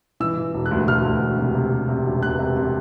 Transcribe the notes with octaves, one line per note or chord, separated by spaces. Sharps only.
E3 E6
E3
E1
F#6
D2
D2 F6
D2
E1
C3
C3
C3
C3
E1
E1 F#6
C3
C3